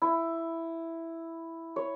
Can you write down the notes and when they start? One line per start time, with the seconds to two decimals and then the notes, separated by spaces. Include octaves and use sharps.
0.02 E4
1.76 C#5